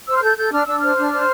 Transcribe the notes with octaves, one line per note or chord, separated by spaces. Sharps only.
C5 E6
F6
A4 G6
A4 G6
D4 F6
D4 E6
C5 F6
D4
C5